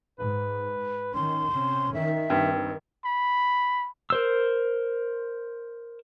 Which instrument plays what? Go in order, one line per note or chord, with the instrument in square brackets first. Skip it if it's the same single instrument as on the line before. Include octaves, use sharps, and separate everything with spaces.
[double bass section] G#2 [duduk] B4
[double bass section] D#3 [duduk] C#4 [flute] C6
[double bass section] C3 [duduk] C#4
[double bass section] D#3 [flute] E5
[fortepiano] G2 [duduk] C4
[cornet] B5
[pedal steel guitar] A#4 C5 E6